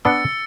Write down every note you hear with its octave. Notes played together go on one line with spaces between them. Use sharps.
B3 D4 E6 A6 C#7